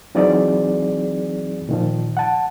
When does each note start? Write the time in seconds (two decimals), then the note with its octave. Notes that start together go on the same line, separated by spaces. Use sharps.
0.15 E3 F#3 C4 D#4 G#4 D5
1.69 A#2 D#3 F3
2.17 F#5 A5